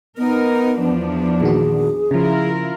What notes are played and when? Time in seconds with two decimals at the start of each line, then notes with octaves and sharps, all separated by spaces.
0.18 B3 D#4 A#4
0.82 E2 F3 D4
1.41 A#2 D#3 F#4 G#4
2.11 C#3 F3 E4 F4 A#4